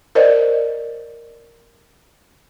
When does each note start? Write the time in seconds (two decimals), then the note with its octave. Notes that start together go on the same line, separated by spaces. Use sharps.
0.15 A#4 C5 D5 D#5